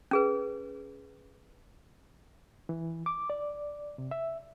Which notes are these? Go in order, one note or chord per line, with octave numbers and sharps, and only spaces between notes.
C#4 G#4 B4
E3
D6
D5
C3
E5